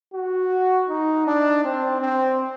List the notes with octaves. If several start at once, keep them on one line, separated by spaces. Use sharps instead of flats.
F#4
D#4
D4
C4
C4